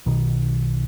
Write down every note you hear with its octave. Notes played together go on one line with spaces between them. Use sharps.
B1 B2 D#3